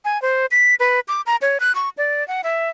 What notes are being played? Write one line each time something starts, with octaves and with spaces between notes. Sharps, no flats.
G#5
C5
B6
B4
D6
A#5
C#5
F#6
C#6
D5
F#5
E5